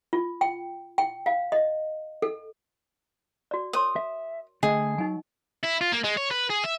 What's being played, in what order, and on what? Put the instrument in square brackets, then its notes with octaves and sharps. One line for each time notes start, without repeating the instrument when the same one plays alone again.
[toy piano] F4
G5
G5
F5
D#5
A4
F#4 D5
[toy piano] A#4 C#5 C6 [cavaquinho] D#6
[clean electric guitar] E5
[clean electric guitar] D3 A3 [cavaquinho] G#4 [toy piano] D#5
[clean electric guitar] F#3 [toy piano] D#4 G#5
[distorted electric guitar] E4
F4
A#3
G#3
C#5
B4
G#4
E5